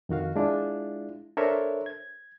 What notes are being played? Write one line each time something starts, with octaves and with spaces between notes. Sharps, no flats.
F2 D#3 F#4 F5
G#3 D4 E4 F4
D4 A4 A#4 C5 C#5 E5
G#6